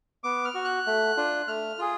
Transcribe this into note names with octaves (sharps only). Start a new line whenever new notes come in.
B3 D6
F6
F#4
F#6
A3
D4 F4
A3 F6
F4 G#4